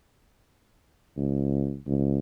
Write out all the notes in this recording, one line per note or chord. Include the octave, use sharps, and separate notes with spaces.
C#2
C#2